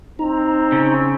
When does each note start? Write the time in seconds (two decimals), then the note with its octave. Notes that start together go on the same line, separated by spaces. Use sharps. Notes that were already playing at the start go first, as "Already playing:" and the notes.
0.19 C4 D#4 A#5
0.72 C#3